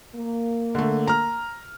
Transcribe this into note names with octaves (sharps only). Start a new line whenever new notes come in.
A#3
D3 A3
A#5 F6